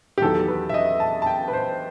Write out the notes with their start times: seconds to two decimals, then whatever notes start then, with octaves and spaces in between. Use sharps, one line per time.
0.18 G4
0.22 E2 D#3 F#3 A4
0.48 B4
0.69 E5
0.74 D#5
1.00 A5
1.22 A5
1.27 G5
1.48 B4
1.53 C5